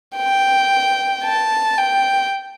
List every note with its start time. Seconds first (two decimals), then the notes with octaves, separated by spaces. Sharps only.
0.17 G5
1.24 A5
1.78 G5